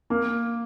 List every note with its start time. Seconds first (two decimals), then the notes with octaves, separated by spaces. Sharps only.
0.10 A#3